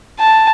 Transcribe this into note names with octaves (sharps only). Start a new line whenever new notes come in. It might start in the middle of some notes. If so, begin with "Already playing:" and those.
A5